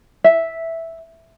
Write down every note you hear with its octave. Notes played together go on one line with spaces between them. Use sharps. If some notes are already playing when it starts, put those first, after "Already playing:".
E5